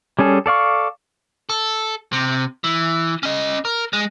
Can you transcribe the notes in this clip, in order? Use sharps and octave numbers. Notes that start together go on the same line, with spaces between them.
G3 C#4 G#4 A4
A4 D5 F5 C#6
A4
C3
E3
C#4 D#5
A#4
G#3